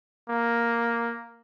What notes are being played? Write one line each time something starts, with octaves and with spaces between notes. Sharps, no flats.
A#3